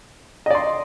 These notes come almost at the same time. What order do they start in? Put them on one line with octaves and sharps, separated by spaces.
D#5 D5 C6